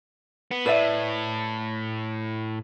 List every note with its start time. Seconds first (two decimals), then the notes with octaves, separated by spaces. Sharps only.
0.51 B3
0.66 A2 B4 D5 E5